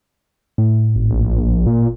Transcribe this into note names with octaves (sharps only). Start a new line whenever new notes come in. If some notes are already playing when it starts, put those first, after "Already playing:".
A2
G#1
A#1
A#2